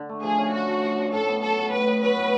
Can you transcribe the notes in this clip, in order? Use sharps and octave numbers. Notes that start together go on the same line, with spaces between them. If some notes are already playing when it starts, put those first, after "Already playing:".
Already playing: D3
A3
F3 G#4
C#4
D3 F#4
A3
F3
C#4
A2 A4
B3
F#3 A4
A2
A2 B4
B3
F#3 B4
A2